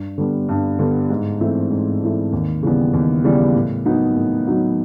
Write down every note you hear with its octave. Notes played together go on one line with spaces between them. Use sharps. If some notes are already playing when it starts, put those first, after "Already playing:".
Already playing: G2
D3 G3 B3
G2
D3 G3 B3
G#2
E3 A3 C4 E4
G#2
E3 A3 C4 E4
D#2
C#3 E3 G3 B3
D#2
C#3 E3 G3 B3
A2
F#3 B3 D#4 F#4
A2
F#3 B3 D#4 F#4